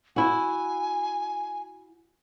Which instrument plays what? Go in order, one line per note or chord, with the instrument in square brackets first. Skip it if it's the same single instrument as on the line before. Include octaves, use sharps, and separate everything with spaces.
[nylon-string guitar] E4 F#4 [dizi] G#5